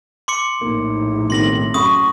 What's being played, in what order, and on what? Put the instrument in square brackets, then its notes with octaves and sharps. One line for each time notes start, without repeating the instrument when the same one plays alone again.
[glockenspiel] C6 D6 C#7
[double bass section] A#1 A2 [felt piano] A#3 [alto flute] D#4
[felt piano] B2 D#3 C4 [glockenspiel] C6 A#6 F#7
[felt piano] F#2 B5 [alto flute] C#6 [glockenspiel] D#6